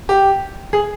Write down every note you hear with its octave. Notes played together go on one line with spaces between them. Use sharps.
G4
G#4